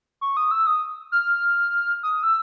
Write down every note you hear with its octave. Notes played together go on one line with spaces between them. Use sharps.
C#6
D#6
E6
D#6
F6
D#6
E6